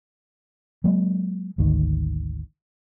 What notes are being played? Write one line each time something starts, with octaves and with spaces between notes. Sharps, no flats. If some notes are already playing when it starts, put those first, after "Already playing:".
F#3 G#3 A#3
G#1 D2 D#3